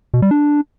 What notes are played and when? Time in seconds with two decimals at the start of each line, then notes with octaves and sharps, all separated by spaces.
0.14 B2
0.22 G3
0.31 D4